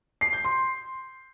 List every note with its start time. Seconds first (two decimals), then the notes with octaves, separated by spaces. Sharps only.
0.21 C7
0.33 G6
0.44 C6